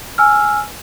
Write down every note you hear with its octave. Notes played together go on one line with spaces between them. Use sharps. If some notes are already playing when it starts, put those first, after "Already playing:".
G#5 E6 F6